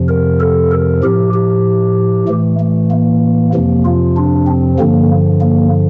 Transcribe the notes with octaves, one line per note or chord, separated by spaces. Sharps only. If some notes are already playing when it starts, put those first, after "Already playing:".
Already playing: F2 C3 F3
A#4
A4
A#4
A2 F3 G4
G4
A2 E3 A3
A3
A#3
F2 C3 F3 A#3
F4
D4
C4
G2 D3 F3 A#3
A#3